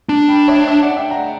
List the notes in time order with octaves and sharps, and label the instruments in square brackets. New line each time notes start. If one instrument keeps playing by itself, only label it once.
[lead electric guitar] D4
[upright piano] G5 B5
C#5 E5
C#5 E5
D5 F#5
E5 G5
F#5 A#5